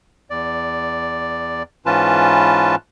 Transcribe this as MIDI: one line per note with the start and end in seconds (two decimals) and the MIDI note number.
0.30 1.63 40
0.30 1.63 74
1.86 2.75 44
1.86 2.75 52
1.86 2.75 61
1.86 2.75 65
1.86 2.75 71
1.86 2.75 81